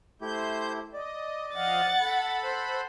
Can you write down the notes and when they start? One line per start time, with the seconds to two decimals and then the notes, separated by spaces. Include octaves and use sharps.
0.21 A3 E4 G4 C5 G6
0.93 D5 D#5
1.54 F3 D#5 F5 F#5 A6
1.99 A4 B5
2.44 C5 F#5